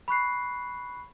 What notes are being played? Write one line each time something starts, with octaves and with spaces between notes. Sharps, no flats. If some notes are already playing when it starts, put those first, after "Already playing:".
B5 C#6 F#6 C7